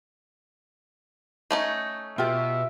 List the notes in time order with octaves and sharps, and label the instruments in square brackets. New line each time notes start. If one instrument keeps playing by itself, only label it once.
[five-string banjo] A3 C#4 D#4
[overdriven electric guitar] B2 [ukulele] F4 G4 [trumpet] E5